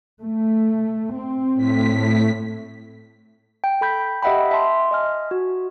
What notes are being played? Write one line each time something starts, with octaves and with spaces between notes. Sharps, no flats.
A3
C4
A2 B6
G5
A4 B5 G6 B6
G4 D#5 E5 F#5 G5 B5
E5 A5 C6
D#5 G#5 F6
F#4